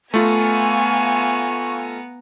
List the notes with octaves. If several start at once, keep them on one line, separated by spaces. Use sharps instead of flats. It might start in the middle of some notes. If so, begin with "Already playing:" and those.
A3 B3 F4 F5 G#5 A#5 C#6